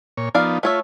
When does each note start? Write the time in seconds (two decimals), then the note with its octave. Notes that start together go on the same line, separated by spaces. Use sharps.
0.17 A#2 C#5
0.35 F3 B3 D#4 A#4 D5 F5
0.63 A3 F4 C#5 E5